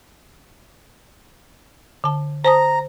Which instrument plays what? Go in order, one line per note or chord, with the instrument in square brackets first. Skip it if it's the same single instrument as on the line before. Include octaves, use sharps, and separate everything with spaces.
[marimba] D3 A5
[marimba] C5 A5 D#6 [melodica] A#5